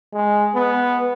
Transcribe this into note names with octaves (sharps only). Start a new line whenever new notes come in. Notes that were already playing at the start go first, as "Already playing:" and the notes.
G#3
B3